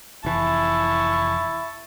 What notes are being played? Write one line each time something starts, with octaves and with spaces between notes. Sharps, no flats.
F1 E3 E4 A5 C#6